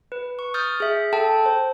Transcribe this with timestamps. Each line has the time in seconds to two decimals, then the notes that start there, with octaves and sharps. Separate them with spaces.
0.12 B4
0.39 C#6
0.54 D#6 F6 G6 A6
0.80 G#4 E5
1.13 A4 G5 A5
1.46 C5